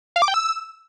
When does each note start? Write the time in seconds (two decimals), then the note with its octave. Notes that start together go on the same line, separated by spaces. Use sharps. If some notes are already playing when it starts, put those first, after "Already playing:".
0.16 F5
0.22 D6
0.28 G5
0.34 E6